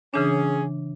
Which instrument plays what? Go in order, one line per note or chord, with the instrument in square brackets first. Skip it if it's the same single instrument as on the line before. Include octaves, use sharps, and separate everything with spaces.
[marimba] C#3 E3 D4 [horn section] C#4 G#4